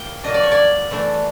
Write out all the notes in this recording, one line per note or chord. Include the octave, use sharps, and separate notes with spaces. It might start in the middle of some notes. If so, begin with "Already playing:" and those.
Already playing: A#3 G5
F#3 A#3 D4 D#5
D5
C#5
D5
E3 A3 D4